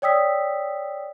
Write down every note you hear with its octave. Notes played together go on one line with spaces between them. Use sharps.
C#5 D5 G5 D#6 E6 B6